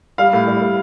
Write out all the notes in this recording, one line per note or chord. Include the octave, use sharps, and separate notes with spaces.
G3 F5
A2
G3
A2